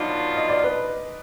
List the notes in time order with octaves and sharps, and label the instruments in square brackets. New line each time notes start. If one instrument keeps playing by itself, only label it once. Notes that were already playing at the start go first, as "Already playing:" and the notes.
Already playing: [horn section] B2 F#3 D4 F4 [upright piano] D#4 D#5
[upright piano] D#5
D5
B4